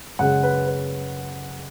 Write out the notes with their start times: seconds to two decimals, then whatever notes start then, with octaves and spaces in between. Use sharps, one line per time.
0.19 F#2 C#3 G#3 F#5
0.43 B4
0.67 B4